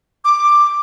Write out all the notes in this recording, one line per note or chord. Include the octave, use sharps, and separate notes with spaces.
D6